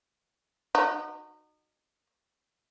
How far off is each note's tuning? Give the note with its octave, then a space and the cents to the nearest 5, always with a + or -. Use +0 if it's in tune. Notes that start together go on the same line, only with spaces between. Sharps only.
D#4 -30 F#4 -5